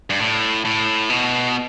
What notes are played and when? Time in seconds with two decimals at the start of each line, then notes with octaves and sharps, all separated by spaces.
0.10 G2
0.19 A2
0.65 A2
1.10 B2